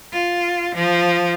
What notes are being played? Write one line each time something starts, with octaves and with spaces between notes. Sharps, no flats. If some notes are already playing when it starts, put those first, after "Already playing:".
F4
F3